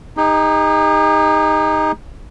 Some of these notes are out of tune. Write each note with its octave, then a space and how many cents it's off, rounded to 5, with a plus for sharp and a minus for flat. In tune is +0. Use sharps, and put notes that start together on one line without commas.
D#4 +0 G#4 -45